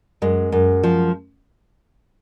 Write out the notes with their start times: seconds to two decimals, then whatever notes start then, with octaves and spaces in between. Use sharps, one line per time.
0.22 F#2 G#3
0.52 F#2
0.83 F3